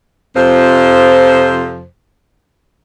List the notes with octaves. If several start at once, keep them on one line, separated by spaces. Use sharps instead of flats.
F2 C3 F3 C5